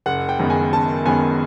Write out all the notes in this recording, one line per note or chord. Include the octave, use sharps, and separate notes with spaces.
F#1 F#5
G5
F#2 D#3 G#3 B3
G#5
F#1 A5
F#2 D#3 G#3 B3 G#5